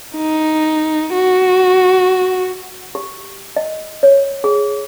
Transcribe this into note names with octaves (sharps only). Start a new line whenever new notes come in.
D#4
F#4
G4
D#5
C#5
G#4